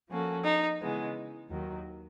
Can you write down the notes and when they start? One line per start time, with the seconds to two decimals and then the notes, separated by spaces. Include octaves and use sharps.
0.10 F3 A#3 C#4 F#4 A4
0.44 D#4
0.80 C#3 E3 G#3 B3
1.49 D#2 D#3 F#3